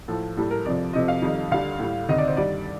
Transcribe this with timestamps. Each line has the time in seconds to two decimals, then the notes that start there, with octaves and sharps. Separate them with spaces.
0.08 A2 F3 A4
0.37 A2 G3 A4
0.51 A#4
0.65 F2 C3 F3 D5
0.93 F2 C3 F3 D#5
1.08 F5
1.22 F2 D#3 G3
1.51 D2 D3 G3 F5
1.79 A2 G3
2.09 D2 C3 D#3 D#5
2.18 D5
2.28 C5
2.37 G2 D#3 G3 D5